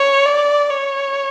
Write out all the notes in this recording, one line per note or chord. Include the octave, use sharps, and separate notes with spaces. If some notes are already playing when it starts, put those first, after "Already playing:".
Already playing: C#5
D5
C#5